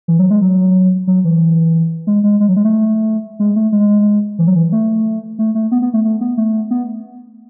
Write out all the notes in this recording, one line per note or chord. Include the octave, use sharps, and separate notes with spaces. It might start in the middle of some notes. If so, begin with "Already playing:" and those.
E3
F#3
G#3
F#3
F#3
E3
G#3
G#3
G#3
F#3
G#3
A3
G#3
A3
G#3
E3
F#3
E3
A3
A3
A3
B3
B3
A3
A3
B3
A3
B3